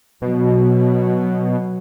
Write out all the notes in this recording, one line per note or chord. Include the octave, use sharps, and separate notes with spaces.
B2 F#3